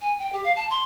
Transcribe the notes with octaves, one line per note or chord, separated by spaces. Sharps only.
G#5
G5
G4
F5
A5
C6